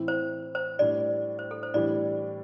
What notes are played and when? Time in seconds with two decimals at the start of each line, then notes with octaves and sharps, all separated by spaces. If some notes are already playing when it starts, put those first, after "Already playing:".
Already playing: A2 E3 C4 E4
0.08 C5
0.55 C5
0.79 A2 G3 D4 D5
1.39 C5
1.51 A4
1.63 C5
1.74 A2 E3 G3 D4 D5